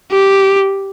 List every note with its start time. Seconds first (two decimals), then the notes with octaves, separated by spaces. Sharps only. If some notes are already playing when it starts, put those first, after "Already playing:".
0.11 G4